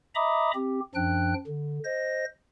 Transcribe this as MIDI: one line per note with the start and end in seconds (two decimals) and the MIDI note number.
0.15 0.51 75
0.15 0.51 76
0.15 0.51 82
0.15 0.51 83
0.15 0.51 86
0.15 0.51 87
0.55 0.80 60
0.55 0.80 67
0.95 1.34 42
0.95 1.34 53
0.95 1.34 62
0.95 1.34 79
0.95 1.34 90
1.47 1.79 50
1.85 2.25 72
1.85 2.25 75
1.85 2.25 94